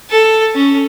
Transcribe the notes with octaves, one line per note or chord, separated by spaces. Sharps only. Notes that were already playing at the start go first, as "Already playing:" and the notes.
A4
C#4